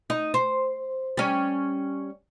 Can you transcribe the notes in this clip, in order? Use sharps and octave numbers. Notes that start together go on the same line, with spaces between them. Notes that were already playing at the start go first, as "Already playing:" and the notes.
D#4
C5
G3 C#4